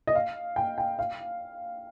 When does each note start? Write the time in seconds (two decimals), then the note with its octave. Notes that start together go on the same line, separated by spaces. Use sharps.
0.07 D#5
0.15 F5
0.56 G5
0.78 G5
0.99 F5